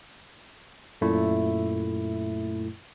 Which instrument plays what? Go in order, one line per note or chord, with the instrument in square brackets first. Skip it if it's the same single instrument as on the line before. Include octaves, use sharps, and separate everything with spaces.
[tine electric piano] F#2 A#2 A3 E4